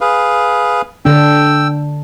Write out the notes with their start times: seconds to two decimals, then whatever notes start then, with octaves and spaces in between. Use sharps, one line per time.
0.01 G#4 B4 F5
1.05 D3 D4 G5 E6